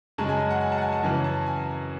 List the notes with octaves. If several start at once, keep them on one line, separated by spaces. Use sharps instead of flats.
F#2 C#3 G#3 A5
G#5
G#5
F#5
G#5
A5
F#5
G#5
A5
F#2 C#3 E3 G#5
A5
G#5